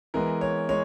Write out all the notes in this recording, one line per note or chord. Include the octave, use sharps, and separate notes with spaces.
E3 G#3 B3 A#4
C#5
G#3 C#5